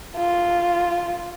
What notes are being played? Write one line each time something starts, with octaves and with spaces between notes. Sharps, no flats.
F4